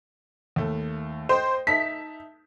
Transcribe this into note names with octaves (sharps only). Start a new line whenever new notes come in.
D#2 A3
C5 D#5 G5
D#4 E5 A5 B6